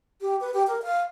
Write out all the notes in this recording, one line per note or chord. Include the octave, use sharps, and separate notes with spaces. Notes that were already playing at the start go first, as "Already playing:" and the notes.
G4
B4
G4
A#4
F5